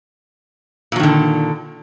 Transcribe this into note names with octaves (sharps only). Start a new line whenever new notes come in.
A#2 D3 D#3 F#3